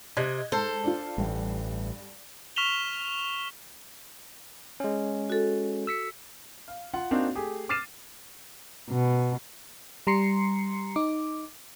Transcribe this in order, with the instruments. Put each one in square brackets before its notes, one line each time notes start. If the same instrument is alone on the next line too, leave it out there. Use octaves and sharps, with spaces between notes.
[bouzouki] C3 [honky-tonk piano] D#5 F#6 G#6
[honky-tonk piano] G#2 [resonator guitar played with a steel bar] A4 [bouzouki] C5
[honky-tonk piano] D4 F4
[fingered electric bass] A1 [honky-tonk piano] G2
[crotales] C#6 F6 B6 E7 F7 G7
[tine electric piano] G#3 C#4
[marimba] F#4 A4
[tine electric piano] E6 B6 C#7
[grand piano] F5
F4 F#5
A#3 C4 D4 D#4 F#4 F5
A3 G4 G#4
D6 F6 A6 C7 D#7 E7
[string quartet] B2
[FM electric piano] G3 A#5 C6 C7 C#7
D#4 D6